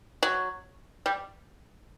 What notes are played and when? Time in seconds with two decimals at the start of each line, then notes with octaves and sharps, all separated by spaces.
0.23 F#3
1.06 G3